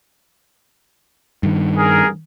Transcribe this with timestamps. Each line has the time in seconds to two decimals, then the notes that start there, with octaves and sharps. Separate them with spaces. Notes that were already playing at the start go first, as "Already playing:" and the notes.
1.43 G2 D#3
1.76 G#4 A#4